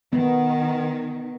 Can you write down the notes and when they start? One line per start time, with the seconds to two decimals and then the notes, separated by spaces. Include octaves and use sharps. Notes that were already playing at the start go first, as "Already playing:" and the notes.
0.13 D#3 B3